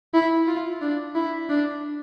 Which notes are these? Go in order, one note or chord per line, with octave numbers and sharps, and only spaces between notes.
E4
F4
D4
E4
D4